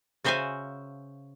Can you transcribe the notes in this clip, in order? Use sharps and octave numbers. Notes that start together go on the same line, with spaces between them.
C#3 F#4 C5 E5 F5 G#5